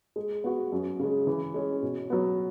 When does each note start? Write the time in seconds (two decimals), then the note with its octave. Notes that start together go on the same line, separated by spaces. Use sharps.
0.16 G#3
0.44 B3 F#4
0.72 F#2
0.99 C#3 G#3
1.27 E3
1.54 G#3 C#4
1.83 B2
2.10 F#3 B3